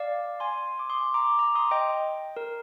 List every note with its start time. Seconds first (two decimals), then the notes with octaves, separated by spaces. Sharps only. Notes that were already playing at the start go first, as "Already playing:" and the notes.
Already playing: D5 F5
0.40 G#5 C6
0.79 D6
0.90 C6 D#6
1.14 A#5 D6
1.39 A#5 D6
1.55 C6 D#6
1.71 D#5 G5
2.37 A#4